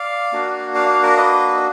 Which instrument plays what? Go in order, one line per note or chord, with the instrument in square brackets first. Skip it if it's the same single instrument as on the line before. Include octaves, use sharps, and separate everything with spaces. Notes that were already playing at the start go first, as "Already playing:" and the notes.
Already playing: [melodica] D5 F5
A#3 D4 F#4
D5 F5
D5 F5
A#4 D5
B4 D#5